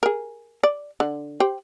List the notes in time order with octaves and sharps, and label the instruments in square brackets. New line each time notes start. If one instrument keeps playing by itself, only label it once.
[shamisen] G#4 A#4
D5
D3
G4 C5 G5